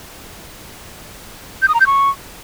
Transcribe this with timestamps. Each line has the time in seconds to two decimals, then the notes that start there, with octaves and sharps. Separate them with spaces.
1.62 G6
1.68 D#6
1.74 A#5
1.81 G6
1.87 C#6